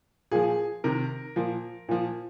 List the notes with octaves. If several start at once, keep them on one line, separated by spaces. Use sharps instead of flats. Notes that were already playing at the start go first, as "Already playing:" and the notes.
A#2 F3 G#4
C3 D#3 A#4
A#2 F3
A#2 F3